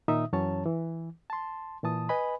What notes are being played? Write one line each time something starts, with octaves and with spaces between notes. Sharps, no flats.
A#2 D#3 D#4 E5 D#6
F#2 E3 F#3 C#4 C#5 A5
E3
A5 C6
A#2 E3 A5 D#6
B4 D#5 G#5 B5